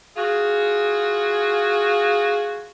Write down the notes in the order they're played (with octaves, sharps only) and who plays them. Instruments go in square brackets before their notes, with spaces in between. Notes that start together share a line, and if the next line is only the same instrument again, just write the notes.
[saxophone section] F4 F#4 G#4